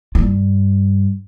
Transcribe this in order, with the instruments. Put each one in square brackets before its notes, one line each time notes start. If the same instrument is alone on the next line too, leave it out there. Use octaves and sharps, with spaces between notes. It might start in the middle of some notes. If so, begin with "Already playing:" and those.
[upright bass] G2 F4